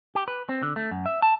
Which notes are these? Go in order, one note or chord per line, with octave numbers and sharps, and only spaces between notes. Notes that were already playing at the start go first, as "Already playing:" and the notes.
G4
B4
C4
D3
A3
F#2
E5
A5